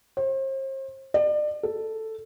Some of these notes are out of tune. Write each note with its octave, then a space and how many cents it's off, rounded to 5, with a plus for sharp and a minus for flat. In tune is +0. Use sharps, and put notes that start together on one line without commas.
C5 +40
D5 +35
A4 +5